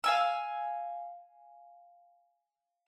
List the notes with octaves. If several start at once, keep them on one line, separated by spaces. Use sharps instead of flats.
F5 G#5 E6